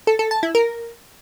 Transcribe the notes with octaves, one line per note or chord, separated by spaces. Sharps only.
A4
A4
A5
E4
A#4